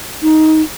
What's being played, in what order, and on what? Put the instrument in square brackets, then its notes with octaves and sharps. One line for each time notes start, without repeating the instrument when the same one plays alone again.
[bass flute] D#4